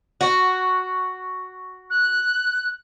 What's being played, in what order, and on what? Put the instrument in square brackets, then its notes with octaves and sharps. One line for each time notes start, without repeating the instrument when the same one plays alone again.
[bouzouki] F#4
[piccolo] F#6